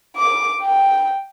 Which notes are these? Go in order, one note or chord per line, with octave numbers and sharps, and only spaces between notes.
D6
G5